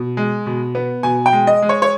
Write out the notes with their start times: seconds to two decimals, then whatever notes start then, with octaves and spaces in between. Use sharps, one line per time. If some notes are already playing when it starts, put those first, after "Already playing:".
Already playing: B2
0.17 G#3
0.46 B2
0.75 B3
1.03 B2 G#5
1.26 G5
1.33 G#3
1.47 D#5
1.62 G#3
1.69 C#5
1.82 C#5